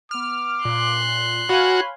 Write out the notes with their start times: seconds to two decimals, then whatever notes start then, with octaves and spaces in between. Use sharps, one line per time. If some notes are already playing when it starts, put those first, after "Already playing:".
0.11 B3 D6 F6
0.65 A#2 C6 F#6
1.49 F#4 C#5 F5 G#5 B5